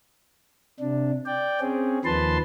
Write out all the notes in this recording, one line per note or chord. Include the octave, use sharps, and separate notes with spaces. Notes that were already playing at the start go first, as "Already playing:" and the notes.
C3 D4
D5 G5
C4 C#4 G#4
D#2 D#3 F3 B4 A5 C6